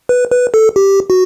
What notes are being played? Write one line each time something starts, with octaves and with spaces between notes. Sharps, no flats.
B4
B4
A4
G4
F#4